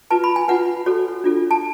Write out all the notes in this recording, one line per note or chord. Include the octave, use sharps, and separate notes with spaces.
F4 B4 A5
B5
G#5
F4 B4 F#5
F#4 A4 C#5
D4 F4 A4
A5